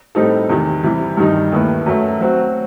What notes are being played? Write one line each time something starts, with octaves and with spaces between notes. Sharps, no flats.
A2 G3 C4 D#4 A4
E2 C3 D#3
C3 E3 G3
G2 D#3 G3 D#4
D#2 D#3 A3 E4 B4
F#2 F#3 A3
F#3 C4 F#4